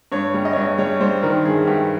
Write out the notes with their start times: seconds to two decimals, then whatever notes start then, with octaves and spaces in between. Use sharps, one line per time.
0.12 G2 C#5
0.34 G3
0.45 D#5
0.53 G2 C#5
0.61 D#5
0.78 G3 C#5
1.00 G3 C5
1.22 D#3 A#4
1.45 G2 G#4
1.67 G2 G4